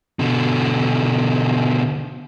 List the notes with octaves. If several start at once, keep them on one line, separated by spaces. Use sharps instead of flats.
B2 D3